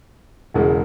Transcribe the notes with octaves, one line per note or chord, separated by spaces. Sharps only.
E1 E2 C#3 G#3